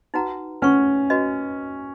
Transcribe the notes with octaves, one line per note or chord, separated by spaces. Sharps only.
D#4 F#4 B4 F#5 A#5
C#4 B4 F#5 C#6
F#4 B4 D#5